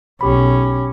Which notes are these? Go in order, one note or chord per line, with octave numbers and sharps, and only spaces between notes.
B1 C#4 G4 B5